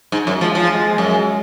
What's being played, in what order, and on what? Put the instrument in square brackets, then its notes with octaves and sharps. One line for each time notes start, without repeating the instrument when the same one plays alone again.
[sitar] G#2
F#2
[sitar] F3 [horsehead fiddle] G#3
[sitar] F3
[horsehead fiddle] G#3
[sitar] F#2